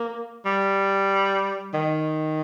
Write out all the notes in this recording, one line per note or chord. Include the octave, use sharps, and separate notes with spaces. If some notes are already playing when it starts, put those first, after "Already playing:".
Already playing: A#3
G3
D#3